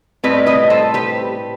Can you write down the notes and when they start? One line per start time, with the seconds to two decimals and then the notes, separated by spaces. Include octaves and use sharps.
0.24 A2 G3 C4 B4 D#5
0.46 B4 D#5
0.70 A4 C5
0.94 G4 B4